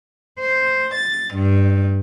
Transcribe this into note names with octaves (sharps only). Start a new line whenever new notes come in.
C5
A6
G2